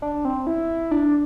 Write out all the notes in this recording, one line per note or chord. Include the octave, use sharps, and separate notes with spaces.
D4
C4
E4
D4